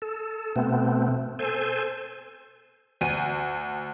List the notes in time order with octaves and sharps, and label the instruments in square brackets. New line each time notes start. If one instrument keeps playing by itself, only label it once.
[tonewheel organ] A4
B2 A3 B3 C4
A4 C5 G#5
[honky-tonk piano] D2 D#7